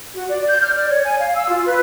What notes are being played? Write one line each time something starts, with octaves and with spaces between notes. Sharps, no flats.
F#4
D5
G6
F6
D5
C#5
G#5
F5
E6
F4
B4